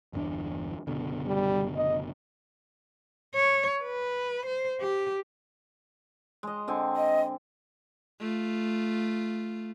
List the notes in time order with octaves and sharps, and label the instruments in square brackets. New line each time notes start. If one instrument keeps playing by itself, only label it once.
[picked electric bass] G1 E2 D4
F#1 B2 D3
[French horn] G3
D#5
[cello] C#5
B4
C5
G4
[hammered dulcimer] G#3 D#5
D3 C4 G#5
[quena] D#5
[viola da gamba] A3 F4